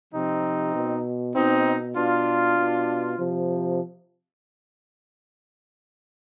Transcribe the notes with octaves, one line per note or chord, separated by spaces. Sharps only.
C3 F3 C4 D#4
B2
B2 C4 D#4
B2 D4 F4
B2
C3 F3